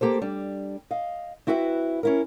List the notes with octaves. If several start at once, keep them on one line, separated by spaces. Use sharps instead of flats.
A#3 G4 A4 C5
G3 D4
D#5 F5
C4 E4 F#4 B4 E5
C#4 E4 A#4